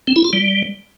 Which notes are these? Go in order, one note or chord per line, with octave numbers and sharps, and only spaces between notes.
C4
E4
F4
G3